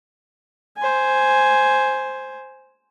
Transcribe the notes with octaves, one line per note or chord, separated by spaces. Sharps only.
C5 G#5